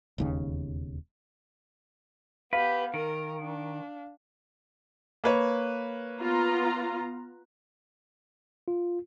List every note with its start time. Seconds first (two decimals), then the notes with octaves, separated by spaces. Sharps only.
0.18 E1 D#2 C#3
2.53 B3 G4 B4 F5
2.94 D#3 A#4
3.43 D4
5.24 A#3 B4 C#5
6.20 B3 F4 A#5
8.68 F4